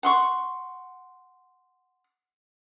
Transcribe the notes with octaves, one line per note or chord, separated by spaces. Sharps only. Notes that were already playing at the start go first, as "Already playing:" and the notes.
F#5 C6 C#6